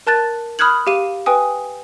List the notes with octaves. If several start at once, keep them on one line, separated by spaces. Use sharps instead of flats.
A#4 A5 F#6 A6
B5 D#6 F6 F#6 G#6 F#7
G4 F5 D#7
B4 G5 G#5 D#6